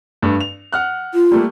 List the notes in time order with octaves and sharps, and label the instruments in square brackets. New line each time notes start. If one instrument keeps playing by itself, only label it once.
[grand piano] G2 A3 D4
F7
F#5 F6 F#6
[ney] F4
[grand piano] G3 A3 A#3